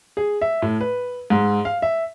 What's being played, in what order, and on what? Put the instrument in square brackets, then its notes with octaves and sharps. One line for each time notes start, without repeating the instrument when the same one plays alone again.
[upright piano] G#4
E5
A2
B4
G#2
F5
E5